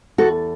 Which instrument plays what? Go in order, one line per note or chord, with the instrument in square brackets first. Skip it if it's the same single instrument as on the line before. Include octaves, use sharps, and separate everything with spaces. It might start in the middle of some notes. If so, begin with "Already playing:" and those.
[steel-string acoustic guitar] E2 F#4 A4